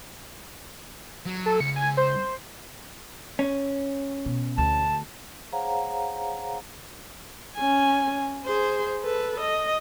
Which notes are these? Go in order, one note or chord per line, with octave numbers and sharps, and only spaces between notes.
F#3
A4
C#2 C#7
G#5
C5
C#4
B2
D2 A5
G#4 C5 C#5 F5 F#5 A#5
C#4 G#5
G#4 C5
A4 B4
D#5